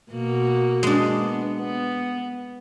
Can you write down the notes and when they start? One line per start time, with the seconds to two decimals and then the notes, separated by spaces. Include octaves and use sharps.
0.12 B2 A#3 F#4
0.83 G#3 D4
1.20 B3
1.60 B3